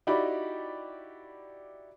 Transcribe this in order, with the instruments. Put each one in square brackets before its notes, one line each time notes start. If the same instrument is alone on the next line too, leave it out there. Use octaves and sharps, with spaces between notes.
[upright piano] D#4 E4 F#4 G4 D5 B5